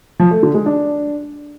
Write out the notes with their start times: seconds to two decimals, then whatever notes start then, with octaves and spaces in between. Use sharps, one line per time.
0.20 F3
0.31 A3
0.43 D3
0.54 G#3
0.66 D4